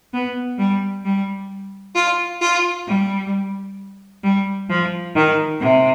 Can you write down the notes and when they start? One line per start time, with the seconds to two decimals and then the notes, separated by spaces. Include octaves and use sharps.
0.13 B3
0.58 G3
1.05 G3
1.95 F4
2.42 F4
2.87 G3
4.23 G3
4.69 F3
5.15 D#3
5.60 C3